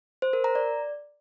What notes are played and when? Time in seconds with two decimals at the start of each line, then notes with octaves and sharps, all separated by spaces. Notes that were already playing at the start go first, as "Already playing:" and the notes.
0.22 C5
0.33 A#4
0.44 A#5
0.55 D5